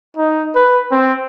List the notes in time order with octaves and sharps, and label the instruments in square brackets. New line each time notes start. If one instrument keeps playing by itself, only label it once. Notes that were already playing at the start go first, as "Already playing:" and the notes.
[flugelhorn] D#4
B4
C4